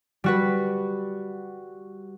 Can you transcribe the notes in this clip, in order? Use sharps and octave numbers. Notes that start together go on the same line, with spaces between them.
G3 F#4 B4